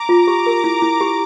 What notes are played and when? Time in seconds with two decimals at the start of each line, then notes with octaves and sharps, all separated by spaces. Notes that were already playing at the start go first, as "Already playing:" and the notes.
Already playing: A#5 D6
0.09 F4
0.27 G4
0.46 A#4
0.64 E4
0.82 E4
1.01 G4